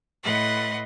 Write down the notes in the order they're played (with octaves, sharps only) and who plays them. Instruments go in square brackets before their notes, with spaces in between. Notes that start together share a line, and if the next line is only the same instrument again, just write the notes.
[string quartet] A2 B4 D#5 F#5 C6